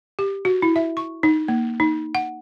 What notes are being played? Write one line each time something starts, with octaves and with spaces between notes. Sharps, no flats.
G4
F#4
E4
E5
C#6
D#4
A#3
D#4
F#5